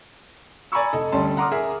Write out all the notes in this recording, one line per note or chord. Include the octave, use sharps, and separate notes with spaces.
D5 G#5 A#5 B5 C#6 E6
F1 A4 D#5
D2 G3 C#4 A5 C6
F#5 A#5 C6 D6 D#6 F6
G#4 A#4 E5